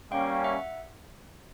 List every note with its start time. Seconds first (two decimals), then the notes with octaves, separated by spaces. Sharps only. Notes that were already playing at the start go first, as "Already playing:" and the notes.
0.11 G3 A#3 C#4 F5 G5
0.44 E5 F#5